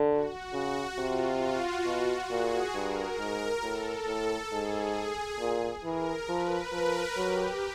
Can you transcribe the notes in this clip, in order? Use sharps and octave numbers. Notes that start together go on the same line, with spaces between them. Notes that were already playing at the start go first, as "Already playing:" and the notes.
Already playing: D3
F#4
C#3 F#4
C3 F4
F#4
B2
A#2 G#4
G2 A#4
G#2 A#4
A2 A4
A2
G#2 G#4
A#2
E3 A#4
F3 B4
F3 A#4
F#3 G4